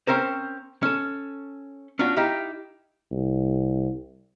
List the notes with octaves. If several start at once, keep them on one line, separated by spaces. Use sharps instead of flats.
C4 C#4 A#4 C5
C#4 A4
C#4 D4 F4 F#4
D#4 E4 G4 F5
C2